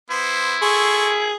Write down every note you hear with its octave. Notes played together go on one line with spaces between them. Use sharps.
B3 E4 C5
G#4 A4 C6 C#6